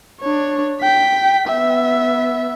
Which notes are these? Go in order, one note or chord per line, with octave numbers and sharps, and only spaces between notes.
D4 C#5
G5 B6
B3 E5